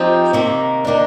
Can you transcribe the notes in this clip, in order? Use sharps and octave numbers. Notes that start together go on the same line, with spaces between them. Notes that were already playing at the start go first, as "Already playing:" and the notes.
Already playing: F3 C4 D#4 G4
C3 D#3 A#3
D#3 A#3 D4